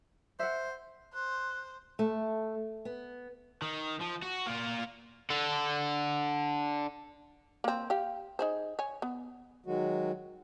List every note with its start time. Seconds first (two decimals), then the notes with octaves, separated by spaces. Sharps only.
0.39 C5 E5 F#5
1.14 C5 F#6
1.99 A3
2.85 B3
3.62 D#3
4.00 F3
4.22 F#4
4.47 A#3 F4
5.30 D3 A4
7.64 A#3 C4
7.90 G4 F5
8.39 D#4 G#4 C5
8.79 C#5 G#5
9.02 B3
9.66 D#3 F#3 G#3 F#4